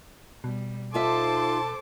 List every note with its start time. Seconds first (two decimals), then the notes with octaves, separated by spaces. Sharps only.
0.44 B2 G3
0.94 D#4 F4 A4 C5 E5 A5 C6 D6